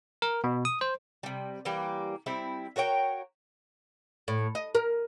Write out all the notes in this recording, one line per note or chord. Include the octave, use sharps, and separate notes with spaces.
A#4
B2
D#6
C5
C3 G3
E3 G3 A#3 G4
G3 C4 E4
F#4 A#4 C#5 G5
A2
D#5
A#4